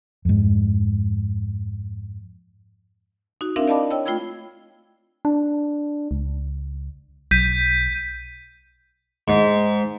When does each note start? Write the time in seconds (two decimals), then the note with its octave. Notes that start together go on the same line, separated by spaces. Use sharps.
0.25 F2 G#2
3.41 D#4 F#4
3.56 C4 D4 E4 A#4 E5 F5
3.68 D5 D#5 F5 A5 B5 D6
3.91 C#5 D#5 G5 E6
4.06 A3 F4 G5 B5 E6 G#6
5.25 D4
6.11 C#2
7.31 B1 G6 B6 D#7
9.28 G#2